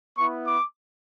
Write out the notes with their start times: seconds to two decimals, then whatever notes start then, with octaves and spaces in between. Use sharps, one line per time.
0.17 B3 E4 C#6
0.45 D6